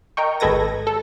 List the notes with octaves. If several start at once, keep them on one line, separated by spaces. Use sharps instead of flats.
A#4 D#5 G5 C#6
G#1 G#3 A4 B4 G#6 A#6
A4